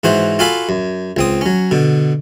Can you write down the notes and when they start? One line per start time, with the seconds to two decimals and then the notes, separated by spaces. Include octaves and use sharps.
0.04 G#2 E3 F#4 C5
0.39 F4 F#4 A4 F5 G#5 B5
0.69 F#2
1.17 C#2 C4 D#6
1.41 F#3 C#4
1.71 B2 D3